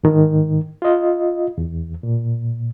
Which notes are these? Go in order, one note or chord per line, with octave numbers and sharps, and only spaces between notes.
G#2 D#3
F4 D#5
E2
A#2